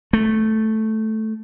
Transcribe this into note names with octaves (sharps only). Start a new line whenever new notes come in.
A3